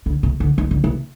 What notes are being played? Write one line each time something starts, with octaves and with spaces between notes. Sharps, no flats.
D3
C3
D3
D#3
D3
C3